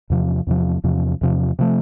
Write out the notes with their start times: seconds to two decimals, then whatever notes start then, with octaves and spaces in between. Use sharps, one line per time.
0.10 E2 C3 F3
0.47 E2 C3 F3
0.84 E2 C3 F3
1.21 E2 C3 F3
1.59 C3 F3 A3